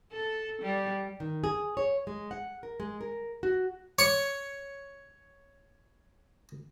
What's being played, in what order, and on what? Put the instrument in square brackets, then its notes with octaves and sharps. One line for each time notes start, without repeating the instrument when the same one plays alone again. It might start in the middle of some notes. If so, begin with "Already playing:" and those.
[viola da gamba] A4
G3
[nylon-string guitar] D#3
G#4
C#5
G#3
F#5
A#4
G#3
A#4
F#4
[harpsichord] C#5 C#6